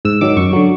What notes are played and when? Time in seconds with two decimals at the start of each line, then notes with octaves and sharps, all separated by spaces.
0.05 G#2 E6
0.21 D#3 F#3 D6
0.37 F#2 C#6
0.53 D3 F#3